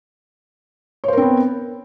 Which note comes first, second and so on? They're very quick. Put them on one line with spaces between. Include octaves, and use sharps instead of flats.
C#5 C5 A#4 C4 B3